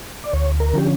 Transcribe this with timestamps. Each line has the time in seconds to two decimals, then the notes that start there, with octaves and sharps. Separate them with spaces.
0.24 D5
0.33 D2 C#5
0.60 A#4
0.74 D3 F3 C#4 G4